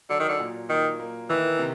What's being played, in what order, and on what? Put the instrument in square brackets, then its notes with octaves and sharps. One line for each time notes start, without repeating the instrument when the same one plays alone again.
[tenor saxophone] D3 [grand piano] F#3
[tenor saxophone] D#3
D3
[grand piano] A#2
[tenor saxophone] D#3 [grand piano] A#3
[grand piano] A#3
[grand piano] D#3 [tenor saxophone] E3
[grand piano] C3